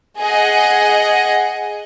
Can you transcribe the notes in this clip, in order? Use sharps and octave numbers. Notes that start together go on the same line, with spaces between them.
G#4 D#5 F#5